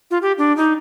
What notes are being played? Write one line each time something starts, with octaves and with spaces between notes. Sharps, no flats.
F4
G4
D4
D#4